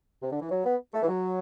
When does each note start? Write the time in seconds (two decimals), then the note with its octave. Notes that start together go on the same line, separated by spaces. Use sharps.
0.23 C3
0.32 D3
0.42 E3
0.51 F#3
0.65 B3
0.94 A3
1.03 E3
1.08 F#3